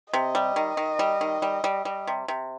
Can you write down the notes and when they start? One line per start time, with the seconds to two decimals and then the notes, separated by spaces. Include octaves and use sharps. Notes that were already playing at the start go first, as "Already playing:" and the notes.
0.13 C3 D#5
0.35 G3
0.56 D#3
0.77 D#3
0.99 G3
1.21 D#3
1.42 G3
1.64 G3
1.85 G3
2.07 C3
2.28 C3